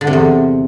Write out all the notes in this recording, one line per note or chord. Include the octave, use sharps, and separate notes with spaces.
D3
C3
E2